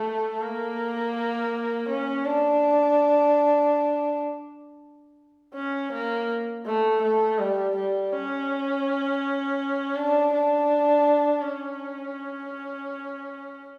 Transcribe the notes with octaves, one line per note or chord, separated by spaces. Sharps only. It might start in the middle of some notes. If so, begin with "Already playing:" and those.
Already playing: A3
A#3
C#4
D4
C#4
A#3
A3
A3
G3
G3
C#4
D4
D4
C#4